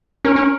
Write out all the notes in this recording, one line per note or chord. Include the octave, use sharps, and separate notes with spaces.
C#4 A#4
C#4